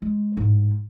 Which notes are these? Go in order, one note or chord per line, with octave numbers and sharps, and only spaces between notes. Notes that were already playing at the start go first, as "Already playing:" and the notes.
G#3
A1 G#2